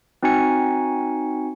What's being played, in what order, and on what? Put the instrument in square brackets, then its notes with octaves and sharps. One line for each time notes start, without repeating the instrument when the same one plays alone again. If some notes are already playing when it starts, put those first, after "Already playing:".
[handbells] C4 D#4 F#4 G#5 C#7